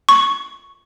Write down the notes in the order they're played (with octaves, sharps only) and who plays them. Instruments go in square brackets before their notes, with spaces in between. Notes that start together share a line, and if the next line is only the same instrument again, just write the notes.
[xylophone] C#6